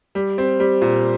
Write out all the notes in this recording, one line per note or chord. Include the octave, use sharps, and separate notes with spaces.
G3
C4
G3
A#2